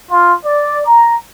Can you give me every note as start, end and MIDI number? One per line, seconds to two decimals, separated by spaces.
0.11 0.31 65
0.45 0.81 74
0.86 1.15 82